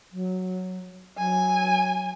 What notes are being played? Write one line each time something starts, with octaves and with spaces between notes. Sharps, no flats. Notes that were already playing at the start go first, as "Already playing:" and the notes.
F#3
F#3 G#5